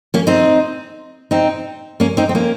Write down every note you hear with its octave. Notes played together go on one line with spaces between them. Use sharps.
A#3 C#4
C4 D#4
C4 D#4
A#3 C#4
C4 D#4
C4
A#3 C#4